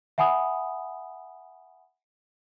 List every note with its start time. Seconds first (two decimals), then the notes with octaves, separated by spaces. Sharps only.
0.18 E5 F#5 G#5 B5 D#6